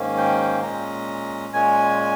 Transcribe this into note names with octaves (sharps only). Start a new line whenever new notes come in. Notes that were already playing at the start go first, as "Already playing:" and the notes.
Already playing: G#2 D#3 A#3 C#4
G5
A#2 G#3 C#4 A#5
A#2 G#3 C#4 G#5